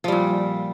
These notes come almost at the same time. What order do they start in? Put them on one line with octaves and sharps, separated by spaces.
F3 G3 A#2